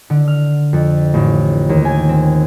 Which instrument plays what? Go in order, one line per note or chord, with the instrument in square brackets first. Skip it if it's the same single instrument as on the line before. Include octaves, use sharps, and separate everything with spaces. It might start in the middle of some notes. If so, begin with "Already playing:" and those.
[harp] D3
F6
F2
A1
D#2
G#5
C4